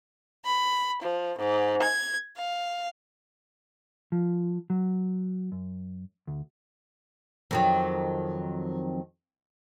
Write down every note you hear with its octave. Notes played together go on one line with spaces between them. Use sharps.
B5
F3
G#2
G#6
F5
F3
F#3
F#2
D2
F2 D#3 F#3